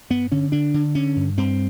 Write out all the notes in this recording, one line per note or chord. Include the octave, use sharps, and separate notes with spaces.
G2 B3
D3 C#4
D3 D4
D3
D3 C#4
G2
G2 C4